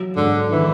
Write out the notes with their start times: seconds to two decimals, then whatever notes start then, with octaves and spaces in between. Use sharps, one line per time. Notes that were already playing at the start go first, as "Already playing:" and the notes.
Already playing: F#3
0.16 G#2 D3
0.52 D#3 E3